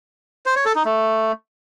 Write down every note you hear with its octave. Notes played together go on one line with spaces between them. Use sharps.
C5
C#5
A4
D#4
A3